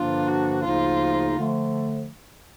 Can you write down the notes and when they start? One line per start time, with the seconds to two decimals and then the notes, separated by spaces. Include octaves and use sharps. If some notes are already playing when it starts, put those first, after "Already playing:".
Already playing: G2 D3 F3 A#3 D4 F4
0.28 F#4
0.64 D2 C#3 F3 A#3 D#4 F4
1.36 D3 F3 A3